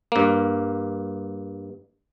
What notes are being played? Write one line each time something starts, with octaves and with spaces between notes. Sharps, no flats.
G2 A#3